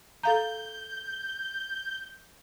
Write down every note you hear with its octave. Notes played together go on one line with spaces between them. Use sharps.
A4 F5 A#5 G6